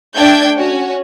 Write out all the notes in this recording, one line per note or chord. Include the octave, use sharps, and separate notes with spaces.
A3 D4 G5 G6 G#6
C#4 F#4 C#5